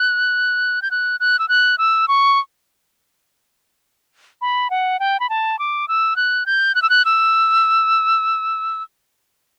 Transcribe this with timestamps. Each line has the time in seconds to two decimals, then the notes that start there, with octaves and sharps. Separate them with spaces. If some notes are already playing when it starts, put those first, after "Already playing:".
Already playing: F#6
0.82 G6
0.91 F#6
1.20 F#6
1.39 E6
1.49 F#6
1.78 E6
2.08 C#6
4.41 B5
4.70 F#5
5.00 G5
5.20 B5
5.30 A5
5.59 D6
5.88 E6
6.16 F#6
6.46 G6
6.75 F#6
6.82 E6
6.90 F#6
7.05 E6